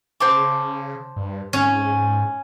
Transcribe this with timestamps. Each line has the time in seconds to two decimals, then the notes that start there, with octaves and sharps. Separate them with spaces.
0.20 C#3 C5 A5 D6
1.16 G2
1.53 G#2 C#4